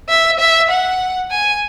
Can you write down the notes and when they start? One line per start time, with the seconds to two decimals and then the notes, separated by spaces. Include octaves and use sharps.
0.09 E5
0.39 E5
0.70 F#5
1.31 G#5